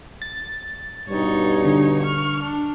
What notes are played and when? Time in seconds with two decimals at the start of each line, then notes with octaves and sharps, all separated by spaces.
0.22 A6
1.09 G2 B2 G3 D#4 C#5
1.65 D3
2.02 C#6 F6
2.42 D4